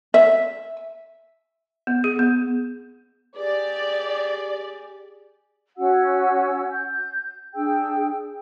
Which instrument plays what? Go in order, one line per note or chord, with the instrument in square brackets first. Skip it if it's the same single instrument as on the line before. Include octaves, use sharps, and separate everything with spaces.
[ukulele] E5
[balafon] B3
G#4
B3
[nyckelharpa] G4 G#4 [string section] D5
[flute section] C#4 F#4 F#5 E6
G6
D4 G#4 G5 E6